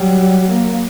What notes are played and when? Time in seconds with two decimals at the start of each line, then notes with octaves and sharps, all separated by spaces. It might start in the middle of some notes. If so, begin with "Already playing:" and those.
Already playing: F#3 G3
0.50 A#3